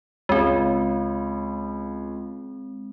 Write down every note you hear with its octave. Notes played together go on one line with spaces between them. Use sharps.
C#2 G#3 C4